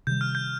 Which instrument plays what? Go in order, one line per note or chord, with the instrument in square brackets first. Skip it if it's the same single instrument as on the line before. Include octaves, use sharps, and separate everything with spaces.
[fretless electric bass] C3 D#3 G3 [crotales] G6
[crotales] F6
G6